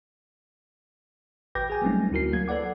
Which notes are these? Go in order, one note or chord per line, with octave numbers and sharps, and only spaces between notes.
G#1 B4 G5 D6 G6 A#6
G#4 G#5
F#3 G3 A3 C4 C#4 D#4
D2 E4 F#4 A#4 C7
F#3 A#3 G#6
A4 B4 D5 F#5 D6